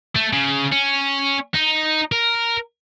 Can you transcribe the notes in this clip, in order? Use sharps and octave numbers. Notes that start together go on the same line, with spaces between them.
A3
C#3
C#4
D#4
A#4